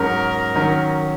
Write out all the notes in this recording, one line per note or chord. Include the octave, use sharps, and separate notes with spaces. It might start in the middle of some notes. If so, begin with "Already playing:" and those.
Already playing: G#2 F#3 C#4 A#4
D#3 F#3 C#4